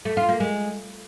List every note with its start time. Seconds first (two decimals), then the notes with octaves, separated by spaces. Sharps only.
0.05 A3
0.17 F4
0.29 A#3
0.40 G#3